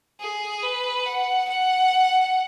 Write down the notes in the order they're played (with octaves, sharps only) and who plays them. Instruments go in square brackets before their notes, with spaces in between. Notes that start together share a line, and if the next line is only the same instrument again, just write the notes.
[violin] G#4
B4
F#5
F#5